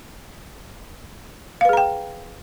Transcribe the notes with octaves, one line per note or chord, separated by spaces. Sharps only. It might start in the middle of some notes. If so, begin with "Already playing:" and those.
G#4 B4 F5 G5 A#5